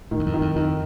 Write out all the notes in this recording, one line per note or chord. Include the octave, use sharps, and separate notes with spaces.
A2 D#3
E2
F2
D#3
F2
F2 D#3